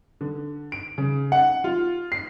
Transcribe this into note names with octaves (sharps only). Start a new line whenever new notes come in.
D3
D7
C#3
F#5
F4
C7